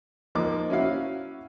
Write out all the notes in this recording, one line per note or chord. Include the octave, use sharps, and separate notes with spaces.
F3 A#3 D#4 D6
C#4 E4 F#4 E5 F5